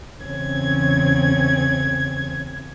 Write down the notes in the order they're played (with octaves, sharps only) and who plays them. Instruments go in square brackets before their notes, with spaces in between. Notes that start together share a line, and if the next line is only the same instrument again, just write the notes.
[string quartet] E2 C#3 C4 C#4 G#6